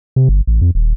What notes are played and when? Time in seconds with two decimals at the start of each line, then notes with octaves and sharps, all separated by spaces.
0.16 C3
0.29 G1
0.47 A1
0.62 F2
0.75 D#1